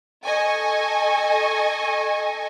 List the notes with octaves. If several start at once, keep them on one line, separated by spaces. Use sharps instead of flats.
A4 D#5 G#5 C#6